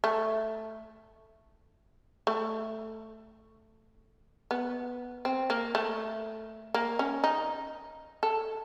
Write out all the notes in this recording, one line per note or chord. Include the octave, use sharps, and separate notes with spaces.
A3
A3
B3
C4
A#3
A3
A#3
C#4
D#4
A4